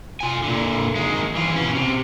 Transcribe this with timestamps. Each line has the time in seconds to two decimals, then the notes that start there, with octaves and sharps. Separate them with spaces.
0.21 F4 G#5
0.44 A#2 D3
0.95 D#3 G#3
1.35 E3 F4
1.56 B2 C#4
1.75 C3